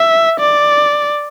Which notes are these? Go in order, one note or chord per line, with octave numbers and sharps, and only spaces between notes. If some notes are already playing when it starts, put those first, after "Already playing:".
Already playing: E5
D5